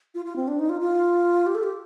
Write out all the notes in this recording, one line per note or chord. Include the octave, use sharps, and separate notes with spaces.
F4
F4
C4
D4
D#4
F4
F4
G4
A4
G4